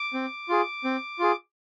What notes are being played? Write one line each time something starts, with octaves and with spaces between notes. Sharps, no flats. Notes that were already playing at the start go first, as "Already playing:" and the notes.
Already playing: D6
C4
F4 G#4
C4
F4 G#4